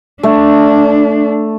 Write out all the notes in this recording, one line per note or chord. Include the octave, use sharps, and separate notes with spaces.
A3 D4